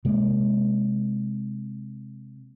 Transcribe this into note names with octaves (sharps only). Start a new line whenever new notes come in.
C3 G#3 A#3